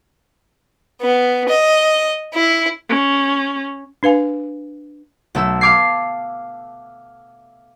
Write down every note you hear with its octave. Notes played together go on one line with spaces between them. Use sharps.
B3
D#5
E4
C#4
D4 B4 F5 G#5
B1 A3 A4 E6
F5 A5 D6 G#6 C7